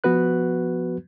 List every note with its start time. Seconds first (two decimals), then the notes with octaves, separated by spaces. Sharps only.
0.04 F3 B3 F#4 B4 F#6